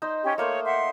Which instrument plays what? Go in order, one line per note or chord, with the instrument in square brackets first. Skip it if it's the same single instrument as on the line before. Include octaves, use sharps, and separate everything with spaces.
[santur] D#4 C5
[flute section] C#4 G4
[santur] A3 A#3 C5 [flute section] C#5
[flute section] E5 F#5 C6